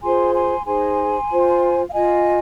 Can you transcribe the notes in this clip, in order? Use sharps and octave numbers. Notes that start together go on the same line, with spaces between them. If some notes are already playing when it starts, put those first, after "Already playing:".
F4 G#4 C5 G#5 C6
G#5 C6
D#4 G#4 C5 G#5 C6
F4 C5
F5
F4 D#5 G#5